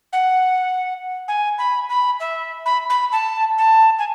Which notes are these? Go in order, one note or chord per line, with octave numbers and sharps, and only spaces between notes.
F#5
G#5
B5
B5
E5
B5
B5
A5
A5
G#5